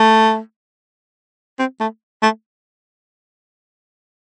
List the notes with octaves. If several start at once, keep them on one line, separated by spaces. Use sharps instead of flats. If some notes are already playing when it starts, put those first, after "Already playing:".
Already playing: A3
C4
A3
A3